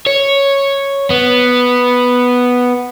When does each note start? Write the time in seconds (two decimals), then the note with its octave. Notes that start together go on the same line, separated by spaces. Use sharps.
0.07 C#5
1.10 B3